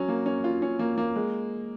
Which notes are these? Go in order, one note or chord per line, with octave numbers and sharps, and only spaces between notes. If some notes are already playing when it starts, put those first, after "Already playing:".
Already playing: F#3 C#4
A#3
C#4
F4
C#4
A#3
A#3
G#3